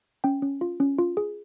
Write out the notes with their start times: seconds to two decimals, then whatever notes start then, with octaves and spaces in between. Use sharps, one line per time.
0.24 C#4 G5
0.42 C#4
0.61 F4
0.80 C#4
0.98 F4
1.17 G#4